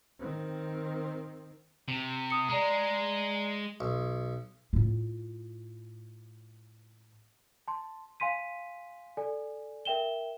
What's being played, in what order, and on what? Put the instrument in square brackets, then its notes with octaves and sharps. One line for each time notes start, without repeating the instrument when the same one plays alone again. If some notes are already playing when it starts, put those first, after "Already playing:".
[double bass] D#3 C4
[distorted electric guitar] C3
[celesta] D#6 C#7
[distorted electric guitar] G#3 [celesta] D5 A#5
[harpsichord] B1
[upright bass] A2 F4
[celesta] A5 C6
F5 G#5 C6 B6 D#7
A4 D5 G#5
A#4 E5 G5 E7 G7